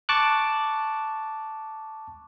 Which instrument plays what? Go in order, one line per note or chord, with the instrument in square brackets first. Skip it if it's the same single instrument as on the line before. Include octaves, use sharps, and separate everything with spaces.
[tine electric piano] A5 C#6 D6 F#6